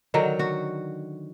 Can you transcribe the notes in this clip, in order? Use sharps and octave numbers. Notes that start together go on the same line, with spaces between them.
D3 D#3 F#3
F#4